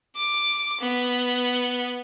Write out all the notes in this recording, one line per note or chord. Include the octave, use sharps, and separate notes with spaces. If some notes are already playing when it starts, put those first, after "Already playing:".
D6
B3